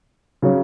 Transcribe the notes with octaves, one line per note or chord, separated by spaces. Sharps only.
C#3 F#3 C#4